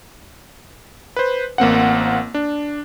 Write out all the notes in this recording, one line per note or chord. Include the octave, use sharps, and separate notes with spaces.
B4 C5
A1 A#3 C4 F#5
D4